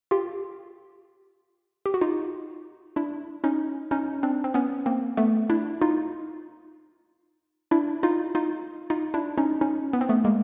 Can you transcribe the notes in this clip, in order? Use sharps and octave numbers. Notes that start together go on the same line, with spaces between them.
F4 G4
G4
F#4
D#4 F4
D4 E4
C#4 D#4
C#4 D#4
C4 D4
C4
B3 C#4
A#3 C4
A3 B3
D4 E4
D#4 F4
D4 E4
D#4 F4
D#4 F4
D#4 F4
D4 E4
C#4 D#4
C#4 D#4
B3
C4
A3 B3
G#3 A#3